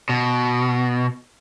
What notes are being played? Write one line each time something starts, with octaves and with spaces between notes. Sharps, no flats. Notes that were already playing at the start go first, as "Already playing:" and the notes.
B2